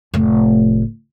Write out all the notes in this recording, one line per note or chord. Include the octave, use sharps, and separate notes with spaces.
F1 A2